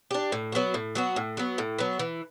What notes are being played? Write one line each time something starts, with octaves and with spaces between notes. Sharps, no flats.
D4 G4
A2
F#3 B3 F#4
A2
F#3 B3 F#4
A2
F#3 B3
A2
F#3 B3
E3